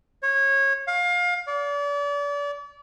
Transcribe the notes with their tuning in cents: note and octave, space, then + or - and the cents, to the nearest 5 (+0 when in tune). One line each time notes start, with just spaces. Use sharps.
C#5 -20
F5 +25
D5 -35